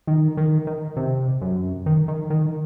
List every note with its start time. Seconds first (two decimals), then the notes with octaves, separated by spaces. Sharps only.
0.07 D#3
0.37 D#3
0.67 D#3
0.97 C3
1.41 F#2
1.86 D#3
2.08 D#3
2.30 D#3